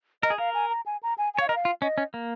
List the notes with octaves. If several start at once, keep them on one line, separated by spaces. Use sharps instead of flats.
A#4 D#5
G#4
A#4 F5
G#5
A#5
G#5
A#5
G#5
G#5
C#5 F5
A#4 D#5
F5
F4
C#4 D#5
C#4
A#3